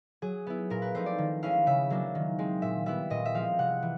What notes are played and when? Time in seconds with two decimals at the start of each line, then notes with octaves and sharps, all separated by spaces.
0.22 F#3 G#4
0.47 B3 E4
0.70 A#2 A#4
0.82 B4
0.94 F3 A3 C4 D#4 C5
1.06 D5
1.18 D#3
1.42 G#3 C#4 E4 F5
1.66 C#3 E5
1.90 F#3 A#3 D4
2.15 D#3
2.39 G#3 C4
2.62 A#2 E5
2.86 G3 B3 E4 E5
3.10 A#2 D#5
3.25 E5
3.34 F3 G#3 C4 F5
3.59 C3 F#5
3.82 E3